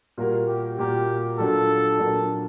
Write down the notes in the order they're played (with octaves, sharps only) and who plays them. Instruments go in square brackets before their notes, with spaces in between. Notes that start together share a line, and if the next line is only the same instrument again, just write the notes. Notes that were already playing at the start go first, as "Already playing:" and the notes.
[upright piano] A#2 G3 A#3 F#4 A#4
[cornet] G4
[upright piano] A#2 G3 A#3 F#4 A#4 [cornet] G4
[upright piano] A#2 F#3 A#3 D4 [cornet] A4
[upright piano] A#2 F#3 A#3 D4